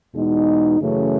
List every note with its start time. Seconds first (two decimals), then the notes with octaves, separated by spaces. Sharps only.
0.14 E2 B2 G#3 D#4
0.80 F#2 C#3 E3 A3 C#4